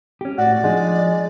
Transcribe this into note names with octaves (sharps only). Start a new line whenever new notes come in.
C#4 G4
A2 F#4 D5
F3 G#3 D4 D#4